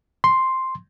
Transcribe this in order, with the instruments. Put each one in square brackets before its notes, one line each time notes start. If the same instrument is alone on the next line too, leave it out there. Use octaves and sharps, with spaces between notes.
[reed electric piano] C6